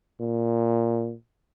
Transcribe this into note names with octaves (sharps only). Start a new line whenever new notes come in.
A#2